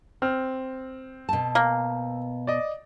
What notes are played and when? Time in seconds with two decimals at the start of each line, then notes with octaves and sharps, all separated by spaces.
0.22 C4 F6
1.29 B2 A5
1.55 A#3
2.47 D5 D#5